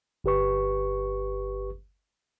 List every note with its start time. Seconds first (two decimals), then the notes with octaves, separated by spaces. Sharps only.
0.24 G1 G4 B4 C#6